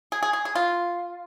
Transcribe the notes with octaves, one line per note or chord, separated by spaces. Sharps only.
G#4
G#4
G#4
G#4
F4